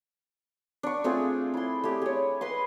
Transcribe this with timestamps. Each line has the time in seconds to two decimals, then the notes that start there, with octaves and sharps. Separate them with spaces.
0.83 D4 C#6
1.04 A3 C4 F4 G#4
1.54 E4 C6
1.84 A3 G4
2.02 G#4 C#5
2.41 B4 D#5 C6